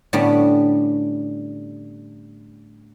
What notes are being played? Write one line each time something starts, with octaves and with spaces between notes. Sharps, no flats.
A2 D3 G3 B3 C#4 D4